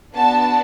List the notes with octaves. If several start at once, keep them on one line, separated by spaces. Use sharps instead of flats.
B3 D4 F#4 A5